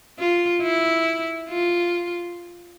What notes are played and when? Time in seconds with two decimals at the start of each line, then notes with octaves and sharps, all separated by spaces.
0.19 F4
0.62 E4
1.50 F4